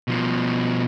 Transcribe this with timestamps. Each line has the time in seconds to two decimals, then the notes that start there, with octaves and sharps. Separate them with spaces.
0.08 B2 F3